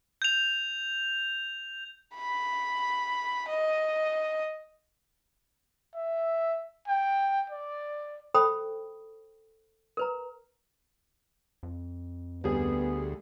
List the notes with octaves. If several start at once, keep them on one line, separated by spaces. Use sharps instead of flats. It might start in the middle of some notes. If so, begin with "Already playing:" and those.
G6 F7
B5
D#5
E5
G5
D5
A4 C5 G5 B5 D#6
A#4 B4 A#5
F2
D2 G3 B3 G#4